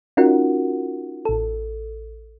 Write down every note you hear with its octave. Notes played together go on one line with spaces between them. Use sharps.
C#4 D#4 F4 F#4 A#4 F#5
A1 A4